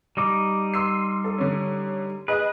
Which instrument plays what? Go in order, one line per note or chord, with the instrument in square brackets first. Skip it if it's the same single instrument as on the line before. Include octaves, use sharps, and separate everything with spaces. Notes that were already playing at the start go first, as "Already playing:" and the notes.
[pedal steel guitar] G3 D#4 D6
[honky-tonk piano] C6 E6 C7
A4
D3 C#4
[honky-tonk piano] G#4 D#5 [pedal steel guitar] B4